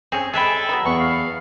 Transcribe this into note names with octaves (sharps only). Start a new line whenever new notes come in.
C4 C#4 G#4
G#3 G#4 A4 E5 G5 B5
F#3 B3 B5
E2 C#6
F5